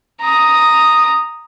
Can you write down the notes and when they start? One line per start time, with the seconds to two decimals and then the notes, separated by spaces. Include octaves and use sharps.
0.21 A#5 D#6